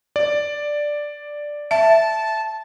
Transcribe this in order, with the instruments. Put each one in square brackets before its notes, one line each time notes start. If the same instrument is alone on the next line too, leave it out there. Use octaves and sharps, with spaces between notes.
[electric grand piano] D5
[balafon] E5 [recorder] A5